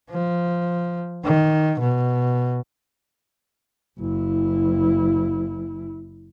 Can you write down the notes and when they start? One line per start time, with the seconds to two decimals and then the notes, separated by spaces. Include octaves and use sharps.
0.10 F3
1.24 D#3
1.80 B2
3.99 F#1 E4